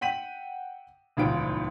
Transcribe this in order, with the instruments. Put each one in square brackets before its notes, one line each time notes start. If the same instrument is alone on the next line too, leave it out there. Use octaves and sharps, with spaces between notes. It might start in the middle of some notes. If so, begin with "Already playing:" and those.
[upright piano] F#5 G5 B6 D#7 F#7
D#1 G#1 C#2 E3 F4 D7